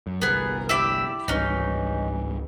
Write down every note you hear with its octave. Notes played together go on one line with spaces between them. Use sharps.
F#2
G1 C2 B3 G#4 A#4
E4 G4 D5 E6
G#1 C#2 G2 E3 C#4 D#4